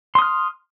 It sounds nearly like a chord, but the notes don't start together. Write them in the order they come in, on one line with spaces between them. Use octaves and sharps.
C6 D#6 F6